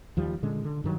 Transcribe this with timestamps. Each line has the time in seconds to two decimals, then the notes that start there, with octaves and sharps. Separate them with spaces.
0.17 D#2 F3 G3
0.43 A#2 D3 G#3 C#4
0.64 D3
0.84 G2 D#3 F#3